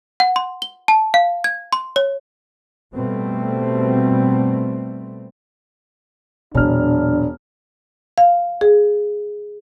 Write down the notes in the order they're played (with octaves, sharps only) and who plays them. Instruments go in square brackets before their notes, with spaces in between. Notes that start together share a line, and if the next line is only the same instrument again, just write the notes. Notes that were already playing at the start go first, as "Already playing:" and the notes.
[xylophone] F#5
C6
G7
A5
F5
G#6
C6
C#5
[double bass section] B2 G3 A3 C4
[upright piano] E1 F6 [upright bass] A#2 F#3 [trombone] D4
[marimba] F5
G#4